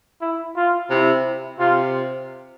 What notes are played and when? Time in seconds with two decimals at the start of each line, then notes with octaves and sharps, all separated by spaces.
0.22 E4
0.57 F4
0.91 C3 E4
1.60 C3 F4